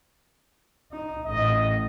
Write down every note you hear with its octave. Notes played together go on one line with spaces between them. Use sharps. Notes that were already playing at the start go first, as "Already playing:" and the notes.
D#4
A1 A2 D#5